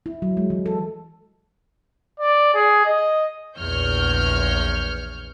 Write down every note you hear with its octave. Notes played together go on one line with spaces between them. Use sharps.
E4
F#3
G#3
E3
A4
D5
G#4
D#5
A#1 E2 C#5 F6 G6